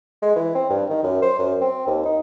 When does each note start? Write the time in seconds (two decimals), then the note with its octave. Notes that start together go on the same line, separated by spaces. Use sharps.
0.22 G#3
0.36 E3
0.55 C4
0.70 G2
0.90 D#3
1.03 F#2
1.22 C5
1.39 F#2
1.61 C4
1.87 D#2
2.05 D#4